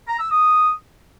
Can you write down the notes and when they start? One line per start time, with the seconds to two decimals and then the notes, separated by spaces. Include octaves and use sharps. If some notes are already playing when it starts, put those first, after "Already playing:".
0.08 A#5
0.20 E6
0.31 D#6